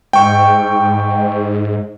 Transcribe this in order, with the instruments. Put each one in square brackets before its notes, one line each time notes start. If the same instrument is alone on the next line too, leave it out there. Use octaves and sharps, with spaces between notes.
[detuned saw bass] G#2 [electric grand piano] G5 C#6